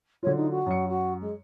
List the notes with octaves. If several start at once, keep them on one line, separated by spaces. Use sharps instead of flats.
D3 F#3 F4 C#5
D#4
F#4
F#2 C#7
F#4
G#3